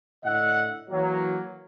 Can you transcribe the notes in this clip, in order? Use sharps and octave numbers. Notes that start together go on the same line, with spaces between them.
A2 D3 D#5 E5 F#5
E3 F#3 A#3